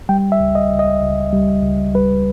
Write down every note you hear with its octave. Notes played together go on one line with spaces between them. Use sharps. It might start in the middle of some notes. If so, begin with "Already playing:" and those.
G3 G5
E5
C#2
D#5
C#2
D#5
C#2
G3
C#2
G3 B4